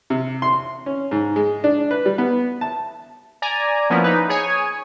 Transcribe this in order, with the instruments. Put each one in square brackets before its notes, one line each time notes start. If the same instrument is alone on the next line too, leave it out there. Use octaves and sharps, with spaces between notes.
[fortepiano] C3
C6
C#4
G#2
G#3
D4
B4
G3
B3
A5
[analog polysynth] D5 G#5 A#5
F3 A#3 B3 C#4 E4
D#4 B4
G#4 C#5 G#5